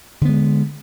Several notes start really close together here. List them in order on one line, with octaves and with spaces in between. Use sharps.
D3 B3 G#3